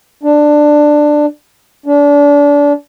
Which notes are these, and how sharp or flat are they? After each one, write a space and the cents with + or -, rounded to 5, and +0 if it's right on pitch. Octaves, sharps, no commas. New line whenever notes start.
D4 +10
D4 -30